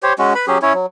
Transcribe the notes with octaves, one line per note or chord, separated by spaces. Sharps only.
G4 C5 C#5
G#3 C#4 F#4
B4 B5
F#3 C#4 G4 G#4
C#4 E4 C#5
F#3